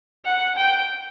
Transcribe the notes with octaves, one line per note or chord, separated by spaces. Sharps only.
F#5
G5